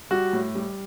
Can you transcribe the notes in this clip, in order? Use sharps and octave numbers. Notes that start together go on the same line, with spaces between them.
G3 F#4
A2
G3